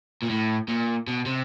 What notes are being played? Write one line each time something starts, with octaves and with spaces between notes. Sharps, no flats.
A#2
A2
A#2
B2
C3